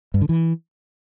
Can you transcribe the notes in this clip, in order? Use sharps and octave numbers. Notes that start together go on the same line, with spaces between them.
G2
D3
E3